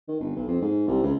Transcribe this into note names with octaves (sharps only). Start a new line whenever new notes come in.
D#3
G1
B1
F2
G#2
C2
C#2